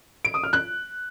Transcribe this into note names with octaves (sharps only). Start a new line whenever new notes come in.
D7
D#6
F6
F#6